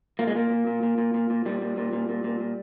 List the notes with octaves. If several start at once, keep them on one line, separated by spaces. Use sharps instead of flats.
A#2 A#3
G#3
A#2 A#3
A#2
A#2
A#2
A#2
A#2
A#2
A#2 G3
A#2
A#2
A#2
A#2
A#2
A#2